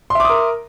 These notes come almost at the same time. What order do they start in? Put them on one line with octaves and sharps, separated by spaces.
C6 E5 D6 D#6 A#4